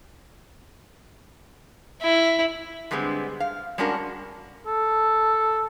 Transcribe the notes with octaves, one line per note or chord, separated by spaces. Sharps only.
E4
D3 G3 G#3 B3 C4
F5
G3 G#3 C#4 D4 F#4 A#4
A4